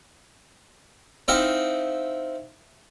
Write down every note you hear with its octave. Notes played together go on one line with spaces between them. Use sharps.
C4 D#4 E4 F5 F#5